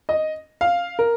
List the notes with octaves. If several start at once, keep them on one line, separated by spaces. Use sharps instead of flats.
D#5
F5
A#4